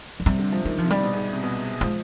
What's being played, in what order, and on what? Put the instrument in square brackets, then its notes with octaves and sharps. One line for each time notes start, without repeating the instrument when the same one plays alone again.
[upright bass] F3
[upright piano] C3 [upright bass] G3
[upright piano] D3
F3
[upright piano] D#3 [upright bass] G3
[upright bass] F3
[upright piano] C3
[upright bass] G3
[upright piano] B2
G#2
C3
B2
[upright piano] F3 [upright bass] G#3